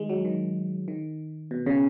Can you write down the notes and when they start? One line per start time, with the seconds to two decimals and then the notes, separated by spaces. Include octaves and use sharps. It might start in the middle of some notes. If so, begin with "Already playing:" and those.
Already playing: D#3 G#3
0.10 F#3
0.25 D#3
0.88 D#3
1.51 B2
1.66 C#3